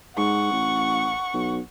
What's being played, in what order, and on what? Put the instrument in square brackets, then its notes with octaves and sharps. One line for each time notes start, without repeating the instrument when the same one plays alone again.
[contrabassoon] G#2 [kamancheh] F#5 C#6
[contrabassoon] A1
B1